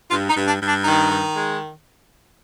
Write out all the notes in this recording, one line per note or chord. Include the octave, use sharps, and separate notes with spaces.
G2 F4
D#4
G2
D4
G2
D4
D#3 D#4
D#3
G#3